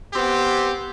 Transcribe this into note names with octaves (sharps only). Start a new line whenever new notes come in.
B3 C4 G4